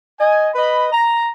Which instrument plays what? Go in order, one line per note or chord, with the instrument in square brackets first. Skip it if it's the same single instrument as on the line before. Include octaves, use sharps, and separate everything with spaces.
[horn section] D#5 G#5
B4 D#5 B5
A#5